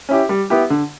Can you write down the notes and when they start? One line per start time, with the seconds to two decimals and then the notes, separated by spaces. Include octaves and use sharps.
0.09 C#4 E4 G4
0.29 G3
0.50 B3 E4 G4
0.70 D3